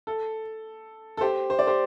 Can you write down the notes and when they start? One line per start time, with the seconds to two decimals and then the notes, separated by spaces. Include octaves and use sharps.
0.07 A4
1.17 A4
1.21 G4 C5
1.50 C5
1.59 D5
1.67 G4 C5